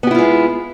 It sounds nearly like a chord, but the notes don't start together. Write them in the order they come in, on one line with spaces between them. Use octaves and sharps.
B3 G4 E4 F4 G#3